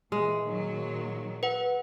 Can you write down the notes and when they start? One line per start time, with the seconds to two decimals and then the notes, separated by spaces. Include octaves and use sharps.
0.12 A#2 E3 G#3
0.45 A#2 D#3 F#3
1.43 B4 F#5